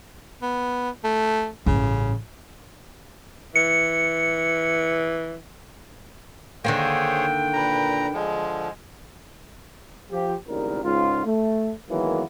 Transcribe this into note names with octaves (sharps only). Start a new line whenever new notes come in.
B3
A3
A1 G2 C#3
E3 C#7
D3 D#3 A#3 G#4 C5 C#5 G5
A#2 B4 A#5
D3 F3 G#3
F3 G4
G#1 C#2 A2 D#3 G3 A#4
C#2 G#2 F4
A3
D#3 E3 F#3 G#3 A#3 B3